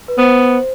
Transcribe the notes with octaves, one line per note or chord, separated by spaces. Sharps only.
B4
B3 C5